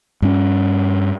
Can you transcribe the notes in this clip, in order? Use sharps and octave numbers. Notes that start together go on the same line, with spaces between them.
G2 C#4